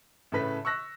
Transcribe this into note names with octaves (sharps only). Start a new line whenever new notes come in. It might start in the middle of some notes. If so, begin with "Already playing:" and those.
A2 C#3 A3 A4 B4 B6
C#6 E6 F#6 A#6